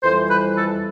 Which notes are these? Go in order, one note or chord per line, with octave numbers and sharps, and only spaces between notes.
F2 E3 G3 C5
B4
A4